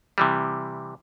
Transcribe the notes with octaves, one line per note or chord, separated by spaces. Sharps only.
C3 E3 G3